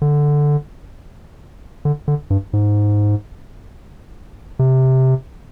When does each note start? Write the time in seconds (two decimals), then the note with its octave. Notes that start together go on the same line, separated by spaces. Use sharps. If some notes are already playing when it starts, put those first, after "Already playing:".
0.02 D3
1.85 D3
2.08 D3
2.30 G2
2.53 G#2
4.59 C3